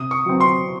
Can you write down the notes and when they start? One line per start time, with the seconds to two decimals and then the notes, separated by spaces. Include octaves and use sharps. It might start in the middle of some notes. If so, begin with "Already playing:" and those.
Already playing: C3 D#6
0.11 C#6
0.26 F#3 C4
0.41 C6